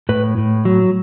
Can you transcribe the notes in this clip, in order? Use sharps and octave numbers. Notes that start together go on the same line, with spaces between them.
A2 B4
A2
F#3